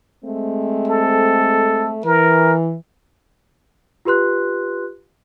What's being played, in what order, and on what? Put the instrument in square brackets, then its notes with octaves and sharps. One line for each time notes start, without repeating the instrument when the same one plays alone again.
[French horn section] G#3 A3 C4
[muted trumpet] A4
[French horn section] E3 [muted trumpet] A#4
[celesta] F4 G4 B4 C6 F#6